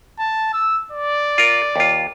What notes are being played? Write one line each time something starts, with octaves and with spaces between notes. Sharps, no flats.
A5
E6
D5
F4 A#4
D#2 F4